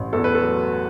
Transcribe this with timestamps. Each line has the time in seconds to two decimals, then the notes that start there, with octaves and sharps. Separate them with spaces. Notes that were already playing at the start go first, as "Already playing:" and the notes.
Already playing: A1
0.13 E2 A4
0.24 B4
0.35 A4
0.43 F#3